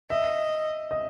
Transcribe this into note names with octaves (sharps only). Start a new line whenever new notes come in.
D#5 E5
D#5